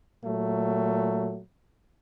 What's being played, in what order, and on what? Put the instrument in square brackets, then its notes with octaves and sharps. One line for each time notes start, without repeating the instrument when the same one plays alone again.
[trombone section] A#2 F#3 A3